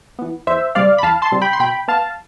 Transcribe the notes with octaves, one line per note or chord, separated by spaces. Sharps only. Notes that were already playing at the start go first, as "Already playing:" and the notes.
E3 B3
E2 C5 E5
C3 G3 C4 D5 F5
B5
E2 F5 A5
A5 C6
C3 G3 C4
G5 B5
C6
B2 G5 B5
B3 F5 A5